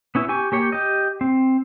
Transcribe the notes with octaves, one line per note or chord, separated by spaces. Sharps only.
B3 C#4 E4
G4 G#5 C#6
A#3 G4 C#5
G4 D#5
C4